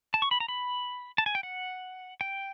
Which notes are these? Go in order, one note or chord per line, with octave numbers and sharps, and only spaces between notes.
A5
C#6
B5
A#5
B5
A5
G#5
G5
F#5
G5